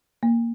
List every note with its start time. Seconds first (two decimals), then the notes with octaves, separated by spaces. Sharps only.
0.23 A#3